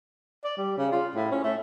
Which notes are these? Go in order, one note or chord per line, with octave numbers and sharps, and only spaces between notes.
D5
G3
C#3
F4
A2
C#4
A3